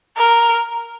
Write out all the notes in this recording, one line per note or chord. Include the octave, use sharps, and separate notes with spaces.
A#4